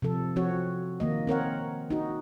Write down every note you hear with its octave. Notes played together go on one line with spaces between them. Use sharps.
C3 F3 A4
F3 C4 F#4 C#5
D#3 A#3 D#5
C4 A#4 C#5 F#5
D#4 F#4